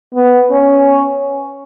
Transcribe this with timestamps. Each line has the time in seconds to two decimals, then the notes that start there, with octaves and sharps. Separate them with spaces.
0.14 B3
0.51 C#4